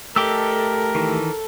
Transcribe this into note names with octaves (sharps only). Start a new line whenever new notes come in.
A3 G4 A4 A#4 D#5 D6 E6
D#3 E3 A4